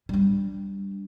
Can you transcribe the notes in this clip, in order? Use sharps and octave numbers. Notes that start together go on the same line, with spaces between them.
G3 D4